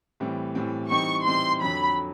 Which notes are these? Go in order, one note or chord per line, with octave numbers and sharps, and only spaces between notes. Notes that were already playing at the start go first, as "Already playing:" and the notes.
A2 E3 G3 C4
A2 E3 G3 C4
E3 G3 C4 D#4 G4 C#6
E3 G3 C4 D#4 G4 C6
F2 D3 F#3 B5